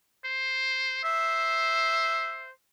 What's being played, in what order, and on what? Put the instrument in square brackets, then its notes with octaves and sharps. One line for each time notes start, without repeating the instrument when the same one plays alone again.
[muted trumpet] C5
[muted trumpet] C5 [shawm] E5